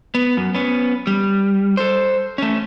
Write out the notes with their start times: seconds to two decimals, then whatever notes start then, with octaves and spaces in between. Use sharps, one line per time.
0.15 B3
0.37 F#2
0.54 B3 C#4
1.07 G3
1.77 A4 C5
2.38 A3 C#4